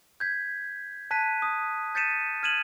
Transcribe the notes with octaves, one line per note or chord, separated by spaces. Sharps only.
G6 G#6 B6
A5 F#6 G#6 B6 D#7
D#6
G6 A6 B6 C#7 D#7 E7
F6 G#6 D#7 E7 F#7